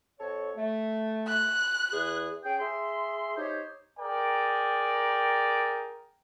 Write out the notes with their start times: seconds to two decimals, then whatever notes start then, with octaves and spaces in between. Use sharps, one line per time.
0.19 F2 A4 C#5
0.57 A3
1.27 F#6
1.93 E2 G#4
2.44 C#4 G#4 G5
2.60 G#4 E5 C6
3.37 D#4 G4 C5 C#5
3.99 G#4 A#4 D5 G5